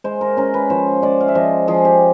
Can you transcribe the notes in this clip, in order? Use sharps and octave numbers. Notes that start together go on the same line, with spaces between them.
G#3 C5
A#4
C#4 A#4
B4
F3 C5
G#3 D5
F5
E5
F3 D#5
F3 G#4
G4